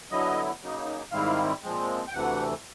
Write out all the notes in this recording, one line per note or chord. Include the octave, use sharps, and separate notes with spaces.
D3 F#3 B3 E4 D#5
C#3 F#3 A#3 D#4
G#2 D#3 G3 C4 E4 F5
A#2 F3 G#3 C4
G5
D2 C3 E3 A3 F#5